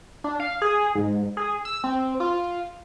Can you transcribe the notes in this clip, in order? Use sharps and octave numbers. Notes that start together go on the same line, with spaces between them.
D4
F5
G#4
G#2
G#4
E6
C4
F4